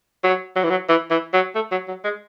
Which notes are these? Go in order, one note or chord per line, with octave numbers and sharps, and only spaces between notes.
F#3
F#3
E3
F#3
E3
E3
F#3
A3
F#3
F#3
G#3